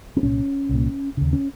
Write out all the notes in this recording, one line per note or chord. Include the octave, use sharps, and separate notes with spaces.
C4
C2 A#2 C#4
C2 A#2
D#2 C#3
C#4